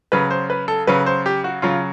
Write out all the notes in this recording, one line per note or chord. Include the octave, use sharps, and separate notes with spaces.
C#3 F#3 B4
C5
B4
A4
C#3 F#3 B4
C5
G4
F#4
C#3 F#3 F4